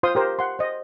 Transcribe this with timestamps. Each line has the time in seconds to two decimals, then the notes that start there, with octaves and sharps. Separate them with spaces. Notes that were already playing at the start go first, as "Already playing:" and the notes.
0.03 F4 C5 F5 C6 D#6
0.15 G4 A#4 C5
0.39 F#5 C6
0.59 C5 D#5